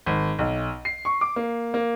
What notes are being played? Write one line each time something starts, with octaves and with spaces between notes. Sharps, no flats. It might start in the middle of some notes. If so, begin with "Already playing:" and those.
G#1
B1
C7
C#6
D6
A#3
A#3